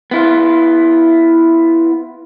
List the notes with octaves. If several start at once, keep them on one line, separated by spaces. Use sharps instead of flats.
B3 E4 F4